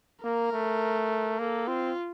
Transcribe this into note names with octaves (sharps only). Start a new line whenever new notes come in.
A#3 A#4
A3
A#3 A4
C4 F4